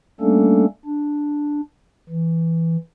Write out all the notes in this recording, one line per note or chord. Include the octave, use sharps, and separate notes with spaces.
G3 A3 A#3 C#4 D4 A4
D4
E3